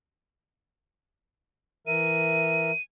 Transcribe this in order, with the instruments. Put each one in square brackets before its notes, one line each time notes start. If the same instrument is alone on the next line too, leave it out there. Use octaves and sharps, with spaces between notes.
[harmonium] E3 A#4 E5 [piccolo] D#7